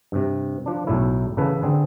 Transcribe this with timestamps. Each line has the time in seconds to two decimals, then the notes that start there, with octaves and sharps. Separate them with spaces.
0.12 G2 C3
0.66 F3 D4
0.87 B1 A2 A3 E4
1.37 A1 C#3 A4 B4
1.63 D3 C4 G#4